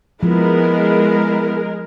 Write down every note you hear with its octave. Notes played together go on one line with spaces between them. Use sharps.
F3 G#3 B3 E4 A#4